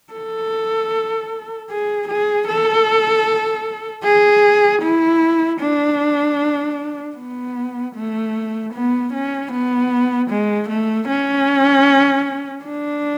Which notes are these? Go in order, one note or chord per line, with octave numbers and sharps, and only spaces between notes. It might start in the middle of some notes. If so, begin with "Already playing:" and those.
A4
G#4
G#4
A4
G#4
E4
D4
B3
A3
B3
C#4
B3
G#3
A3
C#4
D4